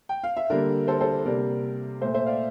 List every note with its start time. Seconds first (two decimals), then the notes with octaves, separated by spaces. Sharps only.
0.09 G5
0.23 F5
0.37 E5
0.50 D3 G3 A#3 A#4 D5
0.88 A4 C5
1.01 A4 C5
1.25 C3 G3 A#3 A#4 D5
2.01 A#2 A3 C5 E5
2.14 C5 E5
2.26 D5 F5